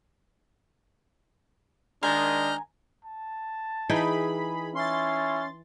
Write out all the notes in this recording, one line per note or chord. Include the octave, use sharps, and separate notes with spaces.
D#3 G#3 D4 G#5 A#5 F6 G6 A#6
A5
E3 D#4 G#4 G5 B5
C#4 E4 C6 A6